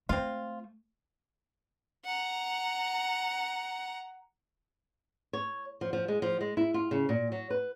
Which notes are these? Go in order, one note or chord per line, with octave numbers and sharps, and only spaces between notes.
A3 C4 F4
F#5 A#5
C#5
F3
F3
G#3
F3
G#3
E4
F4
C#3
A#2
F#3
B4